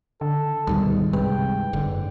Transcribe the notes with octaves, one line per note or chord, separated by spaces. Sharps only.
D3 A4
D2 G#2 B2 D#3 G3
C2 G2 C3 G#3 B4 G5
F#1 G#2 D3